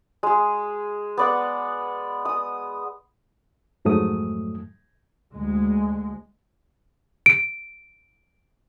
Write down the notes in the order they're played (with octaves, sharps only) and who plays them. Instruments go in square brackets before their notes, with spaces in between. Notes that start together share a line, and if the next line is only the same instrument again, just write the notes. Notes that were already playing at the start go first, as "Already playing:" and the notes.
[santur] G#3 G#4
B3 D5 F#5
D#6
[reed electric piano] F2 G#2 F#3 A3 D#6
[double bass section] D2 G#3
[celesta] D7